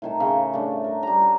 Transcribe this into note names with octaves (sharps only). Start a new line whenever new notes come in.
A2 D#3 A5
C#3
A3 D4
A#4
G3 A#5
F#4